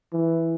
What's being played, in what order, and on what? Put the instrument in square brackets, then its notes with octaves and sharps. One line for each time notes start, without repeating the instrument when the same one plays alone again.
[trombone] E3